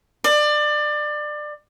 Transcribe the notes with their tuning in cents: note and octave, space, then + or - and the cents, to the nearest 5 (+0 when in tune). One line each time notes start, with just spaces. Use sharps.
D5 +25